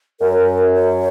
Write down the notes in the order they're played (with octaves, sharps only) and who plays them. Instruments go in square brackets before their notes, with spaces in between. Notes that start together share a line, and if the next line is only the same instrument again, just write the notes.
[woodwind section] F#2 [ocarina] A#4
[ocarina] C#5